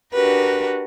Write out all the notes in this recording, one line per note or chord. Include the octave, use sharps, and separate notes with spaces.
D4 F#4 G4 A#4 B4